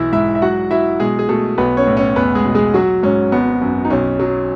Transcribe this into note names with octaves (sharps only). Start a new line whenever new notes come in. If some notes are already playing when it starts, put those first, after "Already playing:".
Already playing: B1 E3 E4 E5
G#2 E4 E5
E5
F#3 F#4 F#5
F#3 E4 E5
B2 G#3 G#4
G#4
B2 A3 A4
B1 B3 B4
C#4 C#5
A2
C#4 C#5
E2 B3 B4
G#3 G#4
B2
G#3 G#4
F#3 F#4
G#2 C#4
G#1 B3
F#2
D#4
B1 C#4
F#3